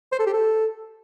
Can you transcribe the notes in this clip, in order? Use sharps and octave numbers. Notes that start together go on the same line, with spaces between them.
C5
A4
G4
A4